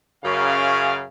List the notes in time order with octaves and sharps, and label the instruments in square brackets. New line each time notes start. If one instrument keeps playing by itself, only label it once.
[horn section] F#2 C#3 F5